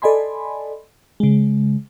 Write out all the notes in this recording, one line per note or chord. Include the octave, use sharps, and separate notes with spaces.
A4 D5 D#5 G#5 B5 C6
C#3 G#3